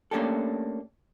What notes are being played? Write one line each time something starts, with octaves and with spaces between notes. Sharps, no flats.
A3 A#3 C#4 D4 G4 A4